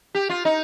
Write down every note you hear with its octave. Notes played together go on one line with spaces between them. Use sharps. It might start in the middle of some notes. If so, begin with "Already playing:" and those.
G4
F4
D#4